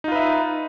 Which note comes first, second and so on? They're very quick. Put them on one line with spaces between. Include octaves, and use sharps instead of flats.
D#4 F4 B4 E5